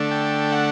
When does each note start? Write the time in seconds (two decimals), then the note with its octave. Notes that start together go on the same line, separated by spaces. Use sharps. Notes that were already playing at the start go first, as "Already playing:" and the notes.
Already playing: D3 A3 D4
0.11 G5
0.52 F#5